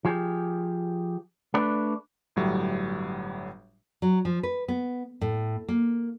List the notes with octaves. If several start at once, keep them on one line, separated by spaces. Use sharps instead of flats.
F3 G4 G#4
A3 D4 B4 D5
G1 A2 F#3 G3
F#3
F3
B4
B3
A2
A#3